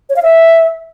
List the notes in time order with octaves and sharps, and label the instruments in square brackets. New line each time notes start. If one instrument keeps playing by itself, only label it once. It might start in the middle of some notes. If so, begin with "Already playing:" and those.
[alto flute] C#5
F5
E5